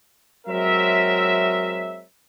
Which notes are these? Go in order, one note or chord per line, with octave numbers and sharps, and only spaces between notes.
F#3 G#3 C4 A#4 C#5 E5